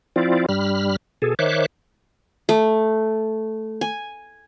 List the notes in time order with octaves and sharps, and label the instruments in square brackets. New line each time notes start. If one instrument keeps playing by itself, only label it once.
[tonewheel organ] F3 C4 E4 F4 D5
G2 G3 B5 F6
B2 G#4 A4
D#3 C5 C#5 E5 D6 F#6
[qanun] A3
G#5